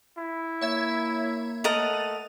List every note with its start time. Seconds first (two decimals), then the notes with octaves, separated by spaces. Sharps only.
0.17 E4
0.61 A#3 C#5 E5 G#6
1.64 A3 A#4 D#5 F#5 A6 D#7 F7